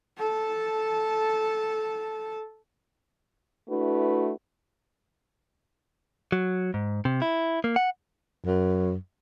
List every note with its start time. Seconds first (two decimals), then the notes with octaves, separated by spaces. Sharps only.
0.18 A4 A5
3.69 A3 D4 E4 F#4 B4
6.32 F#3
6.74 G#2
7.05 C3
7.22 E4
7.64 A#3
7.76 F#5
8.44 F#2